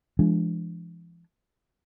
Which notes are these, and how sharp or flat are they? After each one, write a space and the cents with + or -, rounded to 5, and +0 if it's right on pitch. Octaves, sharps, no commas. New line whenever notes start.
F3 -45 G#3 +0 D4 +0